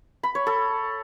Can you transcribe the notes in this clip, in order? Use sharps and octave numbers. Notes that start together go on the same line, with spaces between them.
B5
C#5
A4